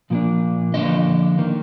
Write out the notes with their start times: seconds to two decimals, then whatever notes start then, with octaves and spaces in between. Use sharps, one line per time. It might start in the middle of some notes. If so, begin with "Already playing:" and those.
0.10 A#2 F3 A#3 D4
0.74 D3 F3 A#3 D4 D#5
1.38 D#3 A#3